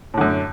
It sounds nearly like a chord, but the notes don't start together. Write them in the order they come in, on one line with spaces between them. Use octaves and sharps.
A2 D3 F#2